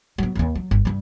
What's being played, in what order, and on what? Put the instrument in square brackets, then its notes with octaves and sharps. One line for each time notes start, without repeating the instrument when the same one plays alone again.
[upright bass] F#3 B3
D1 D#2
F#3
G1
G2 G3